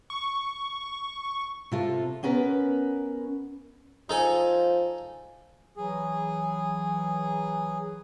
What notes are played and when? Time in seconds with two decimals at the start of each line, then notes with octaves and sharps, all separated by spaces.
0.10 C#6
1.71 C3 F4 A4
2.23 B3 C#4 A#4 B4
4.09 F3 D#4 A4 G#5
5.77 E3 F#3 G#4